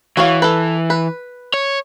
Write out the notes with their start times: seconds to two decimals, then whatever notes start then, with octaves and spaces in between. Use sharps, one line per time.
0.17 E3 F#4 C#5 F5
0.42 A4 B4
0.90 B4
1.54 C#5